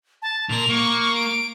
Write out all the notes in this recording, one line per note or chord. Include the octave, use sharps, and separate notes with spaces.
A5
A#2 A#4 F7
A#3 C#6
D7